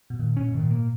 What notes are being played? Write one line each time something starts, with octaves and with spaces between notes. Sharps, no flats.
B2
A#2 D#3
A#2 C#4
G#2
D#3
A#2
A#3